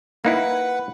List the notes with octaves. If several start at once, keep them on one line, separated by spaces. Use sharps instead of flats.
A#3 D#4 E4 B4 F#5